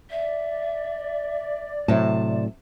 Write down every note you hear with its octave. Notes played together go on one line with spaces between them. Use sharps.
D5 E5
A2 C3 F#3 A5